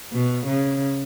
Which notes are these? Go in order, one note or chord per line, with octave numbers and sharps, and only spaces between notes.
B2
C#3